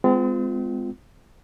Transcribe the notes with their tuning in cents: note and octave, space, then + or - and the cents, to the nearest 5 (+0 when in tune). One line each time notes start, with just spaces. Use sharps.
G#3 +0 C4 -40 F4 +0